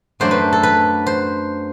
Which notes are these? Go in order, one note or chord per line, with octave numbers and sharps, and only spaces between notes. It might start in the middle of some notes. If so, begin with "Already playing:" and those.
F#2 F#3 A3 D4 C5
B4
A4
B4
C5